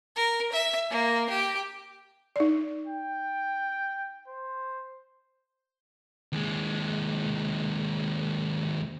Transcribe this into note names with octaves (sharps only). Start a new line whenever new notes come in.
A#4
E5
A#3
G4
D#4 D5
G5
C5
D#2 G#3